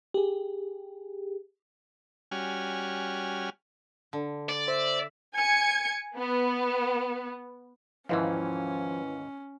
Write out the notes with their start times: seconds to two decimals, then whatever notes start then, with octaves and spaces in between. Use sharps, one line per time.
0.14 G4 G#4
2.32 G3 C#4 F#4 G#5 F6
4.13 D3
4.49 D5
4.68 C5 E5
5.33 G#5 G#6 C#7
6.16 B3
8.09 D#2 G#2 E3 F3 C#4 E4 B4 F5